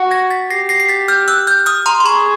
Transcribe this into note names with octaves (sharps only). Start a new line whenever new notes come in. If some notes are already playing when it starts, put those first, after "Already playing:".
Already playing: F#4
G#6 A#6
A6 B6
G4 A#6 C7
A#6 C7
C7
A6 B6
F6 G6
E6 F#6
F6 G6
D#6 F6
A#5 C6
C6
G#4 B5 C#6